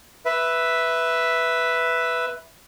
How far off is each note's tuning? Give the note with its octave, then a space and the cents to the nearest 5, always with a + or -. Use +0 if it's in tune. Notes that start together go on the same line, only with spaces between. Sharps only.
B4 +0 E5 +0